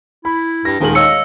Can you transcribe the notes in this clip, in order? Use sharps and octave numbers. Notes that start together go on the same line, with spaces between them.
E4 B5
G2 A#6
D#1 D#3 G#3 A#4 F#7
C#5 D#5 F5 E6 C#7